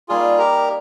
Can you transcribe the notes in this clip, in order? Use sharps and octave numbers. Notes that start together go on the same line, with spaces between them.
G3 A#3 D#4 F4 G#4
G4 A#4